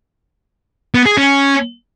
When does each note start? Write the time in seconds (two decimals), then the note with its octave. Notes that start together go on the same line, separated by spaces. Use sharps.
0.95 B3
1.06 G#4
1.17 C#4